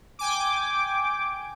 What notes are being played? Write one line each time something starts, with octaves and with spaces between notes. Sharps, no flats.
G5 G#5 D6